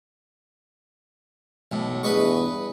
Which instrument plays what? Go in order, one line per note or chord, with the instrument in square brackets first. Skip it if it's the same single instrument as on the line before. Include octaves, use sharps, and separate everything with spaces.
[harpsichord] B1 A2
[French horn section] E2 G2 G#4 [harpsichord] B4 D#5 C#6